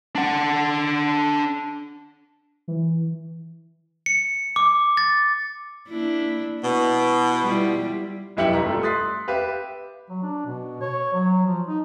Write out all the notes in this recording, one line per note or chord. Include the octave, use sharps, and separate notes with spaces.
D4 F#5
E3
C#7
D6
A6
A#3 D4 E4
B2 E4
G3 E4 F4
F1 B1 E4 G4 C#7 F#7
G1 A#5 B6
G3 A3 F4 A4
C6 D#6 F#6 A6 B6 C7
G4 B4 E5 F5
F#3
D4
B2
C#5
F#3
F3
D#4